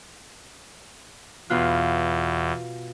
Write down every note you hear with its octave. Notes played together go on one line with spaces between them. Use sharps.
E2 B2 F4 F#6